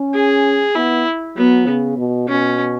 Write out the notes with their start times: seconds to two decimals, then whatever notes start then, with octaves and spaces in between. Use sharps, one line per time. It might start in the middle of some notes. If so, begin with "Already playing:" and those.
Already playing: C#4
0.14 G#4
0.75 B3 E4
1.36 F#3 B3
1.67 C#3
1.98 B2
2.28 B2 C#4